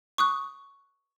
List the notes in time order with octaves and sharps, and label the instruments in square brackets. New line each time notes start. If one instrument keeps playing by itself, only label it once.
[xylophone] C#6 D#6 F#6